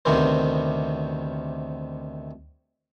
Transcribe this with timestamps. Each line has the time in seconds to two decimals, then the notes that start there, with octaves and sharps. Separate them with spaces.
0.05 D2 C3 D#3 B3 C5